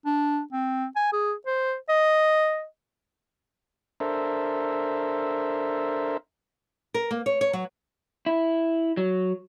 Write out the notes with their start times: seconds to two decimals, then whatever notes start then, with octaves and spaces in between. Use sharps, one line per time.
0.06 D4
0.53 C4
0.96 G#5
1.13 G#4
1.46 C5
1.89 D#5
4.00 D4 A4 A#4 C5 E5
6.94 A#4
7.11 A#3
7.26 C#5
7.41 C#5
7.53 F#3
8.26 E4
8.97 F#3